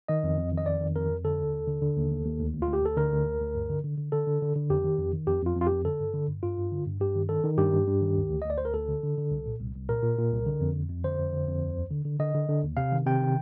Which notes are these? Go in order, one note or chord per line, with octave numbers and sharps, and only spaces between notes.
D#3 D#5
F2
F2
D#3
D#5
F2 D5
D#3
F2 A#4
F2
D3 A4
D#2
D#2
D3
D3
D#2
D#2
D#2
D2
D2
F4
D2
G4
D2 A4
D3 A#4
D2
D2
D2
G2
D3
D3
D3
D3 A4
D3
D3
D3
F2 G4
D#3
F2
D#3
F2 G4
F2 F4
F2
F4
F2 G4
D3 A4
G2
D3
G2
G2 F4
G2
D3
G2
G2 G4
D#3
D#3 A4
D#3
G2 G4
G2
G2
D#3
D2
D2
D2 D#5
D5
D2 C5
A#4
D2 A4
D3
D3
D3
C2
A#2
C2
C2
A#2 A#4
A#2
A#2
C2
D3
F2
F2
F2
D3 C5
F2
D3
F2
D#2
D#2
D3
D3
D3 D#5
D3
D3
D#2
C3 F5
D#3
C3 G5
D#3